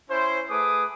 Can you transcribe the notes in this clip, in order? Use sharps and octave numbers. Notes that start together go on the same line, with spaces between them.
C#4 E4 C5
A3 G#4 B4 D6 D#6